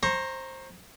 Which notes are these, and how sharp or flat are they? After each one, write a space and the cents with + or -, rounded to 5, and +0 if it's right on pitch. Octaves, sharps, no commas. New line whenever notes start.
C5 +15 A#5 +0 C#6 -15